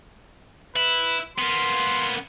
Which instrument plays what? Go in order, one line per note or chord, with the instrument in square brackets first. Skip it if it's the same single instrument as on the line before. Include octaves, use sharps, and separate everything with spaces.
[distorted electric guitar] E4 [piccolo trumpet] B4
[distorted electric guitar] A#3 B3 [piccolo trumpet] C6